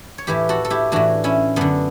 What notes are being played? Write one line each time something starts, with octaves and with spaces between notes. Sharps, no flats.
C#5
A2 E3 G4 B4
F#4 A4
A4
E4 G4
A2 E3 D4 F#4
C#4 E4
F#2 D3 B3 D4